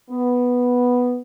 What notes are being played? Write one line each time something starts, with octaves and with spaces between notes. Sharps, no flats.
B3